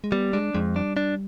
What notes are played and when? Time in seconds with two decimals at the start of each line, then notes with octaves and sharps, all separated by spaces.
0.04 G#3
0.12 G3 B3
0.33 G#3 D4
0.54 F2 G#3
0.76 G3 D4
0.97 D4